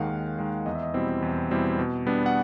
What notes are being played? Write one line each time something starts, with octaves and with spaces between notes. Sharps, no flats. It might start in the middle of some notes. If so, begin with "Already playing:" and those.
Already playing: D#2 D#3 G#3 F5 F#5
D#2
D#3 G#3
E2 D#5
E5
D#5
B2 G3 C4 E4
E2
B2 G3 C4 E4
B2
G3 B3 D4
F#5